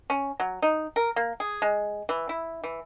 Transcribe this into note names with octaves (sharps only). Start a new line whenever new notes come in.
C#4
F#3
D#4
A#4
A#3
G#4
G#3
E3
E4
E3